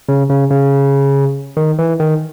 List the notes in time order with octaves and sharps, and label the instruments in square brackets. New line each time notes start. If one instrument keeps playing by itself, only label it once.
[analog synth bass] C#3
C#3
C#3
D#3
E3
D#3